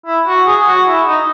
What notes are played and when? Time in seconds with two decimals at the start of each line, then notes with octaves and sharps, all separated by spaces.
0.06 E4
0.27 F#4
0.47 G#4
0.67 F#4
0.87 E4
1.07 D#4